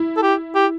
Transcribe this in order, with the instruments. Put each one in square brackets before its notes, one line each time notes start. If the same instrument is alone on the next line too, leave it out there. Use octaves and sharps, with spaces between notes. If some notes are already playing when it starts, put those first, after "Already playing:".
Already playing: [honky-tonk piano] E4
[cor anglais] A4
G4
G4